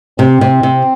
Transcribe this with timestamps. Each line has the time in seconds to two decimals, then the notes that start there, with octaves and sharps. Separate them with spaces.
0.19 C3 C4
0.41 C3
0.63 C3